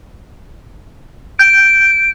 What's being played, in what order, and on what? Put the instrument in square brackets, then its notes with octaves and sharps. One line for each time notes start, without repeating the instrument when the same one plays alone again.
[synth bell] G6 [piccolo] D7